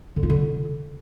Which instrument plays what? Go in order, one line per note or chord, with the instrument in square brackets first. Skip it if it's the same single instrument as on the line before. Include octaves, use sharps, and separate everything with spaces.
[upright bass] D3
F4
D3